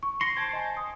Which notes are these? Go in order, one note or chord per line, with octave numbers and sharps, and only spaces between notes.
C#6
C6 A#6 C#7
C5 G5 A5 G#6
D#5 G#5
D#6